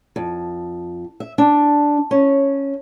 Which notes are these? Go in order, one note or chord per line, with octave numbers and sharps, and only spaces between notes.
F2
E5
D4
C#4